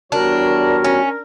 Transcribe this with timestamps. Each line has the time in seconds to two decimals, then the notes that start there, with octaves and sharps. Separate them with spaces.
0.12 E2 G3 D4 F#4 A#4 C#5
0.84 C#4